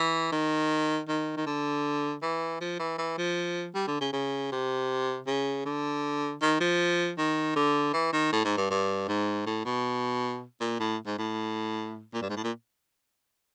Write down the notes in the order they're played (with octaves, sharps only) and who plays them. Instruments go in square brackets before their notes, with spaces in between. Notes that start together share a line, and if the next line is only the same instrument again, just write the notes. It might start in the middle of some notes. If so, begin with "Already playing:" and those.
Already playing: [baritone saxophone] E3
D#3
D#3
D#3
D3
E3
F3
E3
E3
F3
G3
D3
C#3
C#3
C3
C#3
D3
D#3
F3
D#3
D3
E3
D#3
A2
G#2
G2
G2
G#2
A2
B2
A#2
A2
G#2
A2
A#2
G2
G#2
A2
A#2